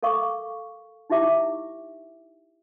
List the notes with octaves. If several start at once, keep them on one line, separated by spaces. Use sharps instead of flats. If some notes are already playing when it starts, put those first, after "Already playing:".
A4 A#4 F5 C#6 D6
D#4 E4 G4 E5 D6